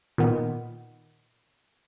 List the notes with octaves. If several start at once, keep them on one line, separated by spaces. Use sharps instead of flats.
A#2 D#3 B3